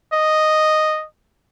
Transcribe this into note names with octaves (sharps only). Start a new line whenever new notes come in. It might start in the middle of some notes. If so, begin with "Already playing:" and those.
D#5